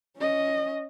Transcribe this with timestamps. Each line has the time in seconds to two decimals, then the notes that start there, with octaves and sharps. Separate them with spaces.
0.17 C#4 D#5